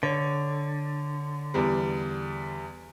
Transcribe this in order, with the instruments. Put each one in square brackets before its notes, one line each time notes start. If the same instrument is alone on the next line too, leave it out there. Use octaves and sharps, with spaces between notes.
[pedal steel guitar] D3 [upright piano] C#5
[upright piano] E2 G3